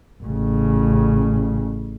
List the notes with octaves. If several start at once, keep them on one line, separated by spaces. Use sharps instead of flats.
A1 C#3